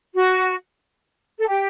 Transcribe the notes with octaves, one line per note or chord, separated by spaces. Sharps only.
F#4
A4
G4